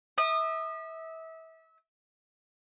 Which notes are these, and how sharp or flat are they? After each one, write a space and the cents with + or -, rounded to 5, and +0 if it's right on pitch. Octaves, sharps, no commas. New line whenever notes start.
E5 -30 D#6 -35